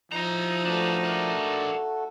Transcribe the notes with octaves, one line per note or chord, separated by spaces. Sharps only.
F3 D#4 E4 A#5
A3 D4 F#4 A4 B4
D4 A#4